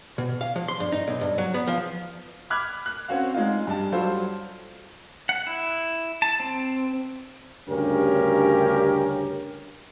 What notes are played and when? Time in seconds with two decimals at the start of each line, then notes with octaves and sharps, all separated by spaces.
0.18 B2
0.41 F5
0.56 F3
0.68 C6
0.80 G2
0.92 D#4
1.08 B1
1.21 G2
1.38 F#3
1.54 B3
1.67 F3
2.50 B5 D6 F6 F#6 G#6
2.86 F#6
3.08 C4 C#4 F#4 F5
3.34 G#3 D#4 F4
3.67 G2 A5
3.92 F#3 G3 F4 A4 C5
5.29 F#5
5.47 E4
6.22 A5
6.40 C4
7.69 D2 G2 C#3 C#4 G4 A#4